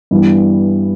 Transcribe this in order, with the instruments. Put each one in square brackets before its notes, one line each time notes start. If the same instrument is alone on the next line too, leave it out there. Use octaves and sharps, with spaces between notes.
[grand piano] G2 E3 G3 B3